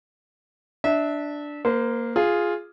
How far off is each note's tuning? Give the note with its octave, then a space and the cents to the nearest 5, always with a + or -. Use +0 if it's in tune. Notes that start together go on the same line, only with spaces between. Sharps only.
D4 +0 E5 -25
A#3 +0 C5 -30
F4 +0 G#4 +0